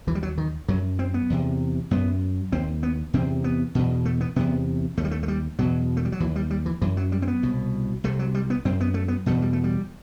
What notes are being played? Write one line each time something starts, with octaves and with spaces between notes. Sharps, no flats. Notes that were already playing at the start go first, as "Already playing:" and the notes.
D#2 E3
G3
F#3
D#3
F#2 F#3
C4
B3
E2 C3
F#2 B3
D#2 C4
B3
E2 C3 C4
B3
E2 B2
A3
B3
E2 C3 B3
D#2 A3
G3
A3
A3
G3
E2 B2 F#3
A3
G3
F#3
D#2 E3
G3
G3
E3
F#2 E3
F#3
G3
C4
B3
C2 B2
C2 C3 A3
F#3
G3
B3
F#2 C4
B3
A3
B3
E2 B2 A3
G3
A3
G3